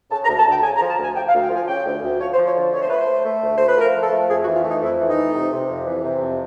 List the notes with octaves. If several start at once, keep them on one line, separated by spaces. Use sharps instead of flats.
C#3 A5
A#5
D2
A5
D2 G5
C#3 G#5
A#5
F3
A5
D2 G#5
F3 G5
F5
D2
G5
F3 G#5
C#3 G5
D2
D2
F3 C#5
C5
F3
C#5
D3
A3 C#5
C5
A3 B4
C5
A3
A3
D2
A3 C5
B4
F3 A#4
F3
A4
A3
F2 G#4
F#4
E3
F4
A3 D#4
F2 E4
E3
D#4
A3
C3
C3
F2
E3
C3
F2